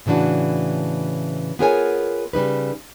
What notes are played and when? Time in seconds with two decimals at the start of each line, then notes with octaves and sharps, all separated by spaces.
0.06 A2 C#3 E3 D4 F#4
1.59 B3 F4 G#4 A#4 C#5 G#5
2.33 C#3 G3 D#4 B4